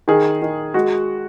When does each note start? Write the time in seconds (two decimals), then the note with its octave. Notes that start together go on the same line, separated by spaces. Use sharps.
0.08 D#3 G#4
0.42 D#3
0.74 G#3 F#4